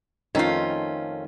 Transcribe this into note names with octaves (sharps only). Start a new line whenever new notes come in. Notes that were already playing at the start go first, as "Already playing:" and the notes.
F2 D#3 A3 C#4 F4 F5